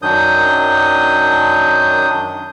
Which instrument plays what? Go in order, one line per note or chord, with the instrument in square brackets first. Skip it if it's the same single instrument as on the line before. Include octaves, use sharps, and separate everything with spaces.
[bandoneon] F#2 D#3 F#3 D4 D#6 G6